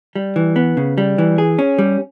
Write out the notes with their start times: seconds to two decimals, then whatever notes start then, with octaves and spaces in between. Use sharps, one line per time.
0.16 G3
0.36 E3
0.56 B3
0.77 C#3
0.98 G3
1.18 E3
1.38 G#4
1.59 C#4
1.79 G3